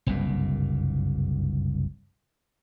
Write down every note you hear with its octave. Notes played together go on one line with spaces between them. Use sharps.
F#1 C2 G2 A#2